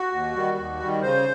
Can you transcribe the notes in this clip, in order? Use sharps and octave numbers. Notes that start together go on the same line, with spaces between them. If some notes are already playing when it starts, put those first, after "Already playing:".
Already playing: F#4
D#2
D#3 G3
D#2
D#3 G3
C#3 C5